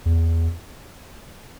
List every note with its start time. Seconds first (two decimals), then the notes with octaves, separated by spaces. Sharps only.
0.05 E2